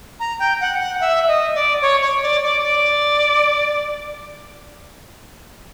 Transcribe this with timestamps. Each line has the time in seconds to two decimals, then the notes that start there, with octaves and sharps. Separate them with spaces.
0.19 A#5
0.39 G5
0.60 F#5
0.80 F#5
1.00 E5
1.28 D#5
1.55 D5
1.81 C#5
2.01 C#5
2.22 D5
2.43 D5
2.63 D5